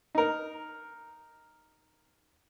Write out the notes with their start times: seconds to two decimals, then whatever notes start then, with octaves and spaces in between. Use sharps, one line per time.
0.15 D#4 A#4